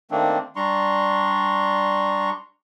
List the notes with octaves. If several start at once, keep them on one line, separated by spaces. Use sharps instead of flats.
D#3 A3 A#3 C4 D4
G3 D4 A#5 C6 C#6